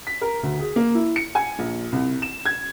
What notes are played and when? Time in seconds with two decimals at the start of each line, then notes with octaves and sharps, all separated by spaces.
0.07 B6
0.21 A#4
0.43 D2
0.59 G#4
0.76 A#3
0.95 E4
1.16 C#7
1.35 G#5
1.59 A#1
1.92 C2
2.22 E7
2.46 G#6